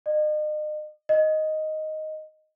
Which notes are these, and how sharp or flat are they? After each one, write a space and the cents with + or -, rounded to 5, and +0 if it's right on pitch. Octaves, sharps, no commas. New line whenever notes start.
D#5 -40
D#5 +0